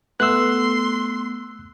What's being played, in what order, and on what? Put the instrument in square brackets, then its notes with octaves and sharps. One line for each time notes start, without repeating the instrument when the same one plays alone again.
[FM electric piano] A3 B3 [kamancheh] C6 [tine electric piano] E6 F#6